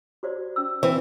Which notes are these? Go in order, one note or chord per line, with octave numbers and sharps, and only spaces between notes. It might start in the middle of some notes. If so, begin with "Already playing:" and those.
F#4 C5 D5
C#4 E6
E3 C4